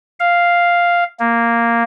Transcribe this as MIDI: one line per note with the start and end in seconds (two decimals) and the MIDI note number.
0.20 1.04 77
1.19 1.83 58